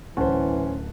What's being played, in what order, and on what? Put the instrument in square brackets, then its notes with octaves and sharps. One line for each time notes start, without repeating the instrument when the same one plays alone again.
[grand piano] D1 F#5 A5 [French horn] E3 [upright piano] C#4 C5